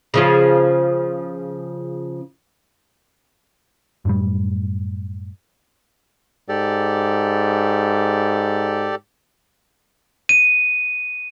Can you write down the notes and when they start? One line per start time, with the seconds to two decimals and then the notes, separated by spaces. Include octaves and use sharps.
0.14 C#3 F3 F4
4.05 F#2 A2 G3
6.49 G#2 G4 A4 D5
10.29 D#7